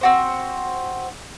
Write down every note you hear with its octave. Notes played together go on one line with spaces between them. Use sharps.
C4 F#4 C5